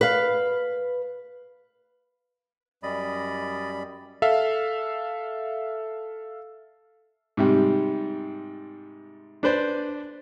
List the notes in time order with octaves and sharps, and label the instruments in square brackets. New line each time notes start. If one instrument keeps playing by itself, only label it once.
[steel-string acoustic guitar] B4 F5
[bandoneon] F#2 G3 B5 [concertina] D5 D#5
[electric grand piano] A4 E5 F5
[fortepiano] G#2 C3 G3
D4 B4 C5 D5